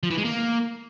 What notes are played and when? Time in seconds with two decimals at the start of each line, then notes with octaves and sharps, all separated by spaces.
0.03 F3
0.10 E3
0.17 G#3
0.25 A#3